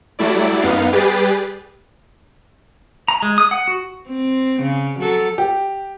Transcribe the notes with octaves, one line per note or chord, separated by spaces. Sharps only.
F#3 G3 A3 E4 D5
F#2 B3 D#4 F5
G3 G4 G#4 B4 A6 C7
A#5
G#3
D#6
F#5
F#4
C4
C#3
F#3 A4
G4